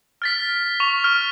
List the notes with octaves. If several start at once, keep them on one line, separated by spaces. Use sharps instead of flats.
F6 A6 B6
C#6 F7
F6